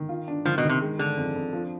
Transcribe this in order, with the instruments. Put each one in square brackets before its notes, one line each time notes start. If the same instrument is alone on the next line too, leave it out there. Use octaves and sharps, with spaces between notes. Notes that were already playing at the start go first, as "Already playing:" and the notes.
Already playing: [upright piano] D#3
F4
D4
[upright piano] D#3 [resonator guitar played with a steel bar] F3
[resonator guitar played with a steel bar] B2
[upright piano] D#3
[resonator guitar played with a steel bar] C3
[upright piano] G#3
[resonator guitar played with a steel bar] D3 [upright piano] G#3
[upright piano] F2
F2
F3